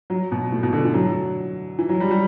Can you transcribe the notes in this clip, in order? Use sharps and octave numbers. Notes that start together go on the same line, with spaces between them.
F#3
B2
A2
B2
D3
E3
F#3
E3
F#3
G3
G3